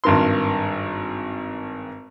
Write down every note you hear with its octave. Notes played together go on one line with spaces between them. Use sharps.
G#1 G2 A#4 C6